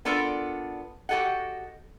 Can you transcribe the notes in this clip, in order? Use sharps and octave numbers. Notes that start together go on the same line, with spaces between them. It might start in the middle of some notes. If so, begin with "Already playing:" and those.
B3 D4 F4 A4 A#4 D5
F#4 G4 A4 D#5 F#5